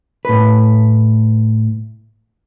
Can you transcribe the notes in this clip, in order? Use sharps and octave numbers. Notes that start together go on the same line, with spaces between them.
A2 B4